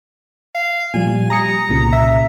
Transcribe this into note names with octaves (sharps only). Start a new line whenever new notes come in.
F5
A#2 F3 G3 G#5
G3 A#5 D#6 C#7
C2 A#2 C#3
E5